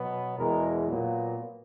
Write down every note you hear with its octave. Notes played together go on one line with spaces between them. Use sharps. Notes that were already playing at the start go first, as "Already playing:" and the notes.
Already playing: B2 F#3 B3
E2 B2 G#3 B3 A#4
A#2 F#3 B3